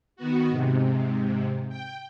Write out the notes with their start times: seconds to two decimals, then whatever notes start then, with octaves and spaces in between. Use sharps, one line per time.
0.16 D#3 B3 F#4
0.49 G#2 C3
1.69 G5